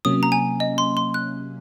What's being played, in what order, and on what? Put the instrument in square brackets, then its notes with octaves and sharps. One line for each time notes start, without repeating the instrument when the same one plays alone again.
[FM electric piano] C3 F#3 A#3 C#4 [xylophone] D#6
[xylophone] A#5
G#5
D#5
C6
C6
F#6